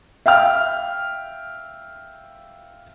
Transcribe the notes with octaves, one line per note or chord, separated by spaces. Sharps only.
E5 F5 G5 F6